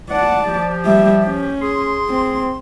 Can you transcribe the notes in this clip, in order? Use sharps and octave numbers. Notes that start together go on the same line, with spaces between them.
D5 F#5 A5
F3 G4
G3 E5
C#4
G#4 C6
C4